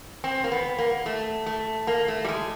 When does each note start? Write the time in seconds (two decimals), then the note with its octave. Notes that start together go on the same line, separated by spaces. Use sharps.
0.24 C4
0.44 A#3
0.52 B3
0.79 A#3
1.06 A3
1.46 A3
1.87 A#3
2.08 A3
2.24 G3
2.29 G#3